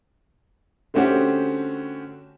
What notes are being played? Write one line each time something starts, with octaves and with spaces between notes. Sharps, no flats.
D3 A3 C4 C#4 F#4 G4